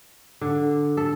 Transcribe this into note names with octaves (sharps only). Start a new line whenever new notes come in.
D3
A4